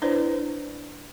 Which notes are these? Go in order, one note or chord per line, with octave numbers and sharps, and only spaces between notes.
D4 E4 B4 C5 D5